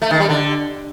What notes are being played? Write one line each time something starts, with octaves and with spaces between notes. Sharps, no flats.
A3
D#3
G3
D3